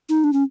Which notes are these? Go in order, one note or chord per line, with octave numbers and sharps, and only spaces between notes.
D#4
D4
C#4